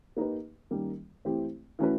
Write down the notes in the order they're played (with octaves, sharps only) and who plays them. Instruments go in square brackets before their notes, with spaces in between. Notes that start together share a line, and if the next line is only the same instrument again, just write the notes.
[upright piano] A#3 D#4 G4 B4
D#3 G3 A#3 C#4
E3 A3 C4 E4 G4
E3 A3 C#4 F#4 B4